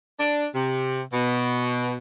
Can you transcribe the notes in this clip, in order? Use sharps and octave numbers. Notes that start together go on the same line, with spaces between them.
D4
C3
B2